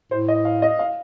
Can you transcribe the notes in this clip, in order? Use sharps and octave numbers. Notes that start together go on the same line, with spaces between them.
A2 C5
D#5
F5
D#5
F5